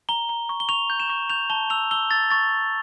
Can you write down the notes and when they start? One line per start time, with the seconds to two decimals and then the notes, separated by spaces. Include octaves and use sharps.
0.09 A#5 G7
0.29 A#5
0.49 C#6
0.60 G7
0.69 C#6 F7
0.90 G6
1.00 E7
1.09 C#6
1.30 G6 F7
1.50 A5 G7
1.70 E6 F7
1.91 E6 G7
2.11 E6 A6
2.31 C#6 A6